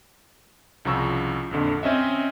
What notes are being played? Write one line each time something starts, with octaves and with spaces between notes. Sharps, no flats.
C2 C#3 F3 A#5 C#6 E6
A#1 F2 D3
C4 C#4 D#5 E5